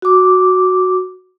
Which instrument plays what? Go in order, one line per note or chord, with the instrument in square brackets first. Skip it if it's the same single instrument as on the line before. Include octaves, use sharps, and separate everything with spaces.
[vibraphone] F#4 D6